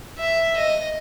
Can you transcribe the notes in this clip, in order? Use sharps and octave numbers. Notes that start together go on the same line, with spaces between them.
E5
D#5